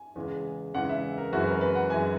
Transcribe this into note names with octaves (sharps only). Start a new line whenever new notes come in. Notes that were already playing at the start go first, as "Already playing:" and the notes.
Already playing: G#5
E2 C#3 G#3
E2 C#3 G#3 F#5
E5
A#4
F#2 E3 G#3 F#4
B4
A#4
B4
F#5
F#2 E3 G#3 G#5